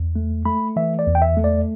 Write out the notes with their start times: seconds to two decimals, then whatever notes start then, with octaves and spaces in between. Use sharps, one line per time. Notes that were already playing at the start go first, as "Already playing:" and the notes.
Already playing: E2
0.16 A3
0.45 A3 B5
0.76 E3 E5
0.99 D5
1.07 E2
1.15 G5
1.22 E5
1.37 A3
1.44 D5